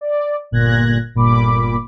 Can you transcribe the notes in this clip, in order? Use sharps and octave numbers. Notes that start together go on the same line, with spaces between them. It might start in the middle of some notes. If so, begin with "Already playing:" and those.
D5
G1 A#2 F#6 G#6 A#6
G1 A#2 B5 D6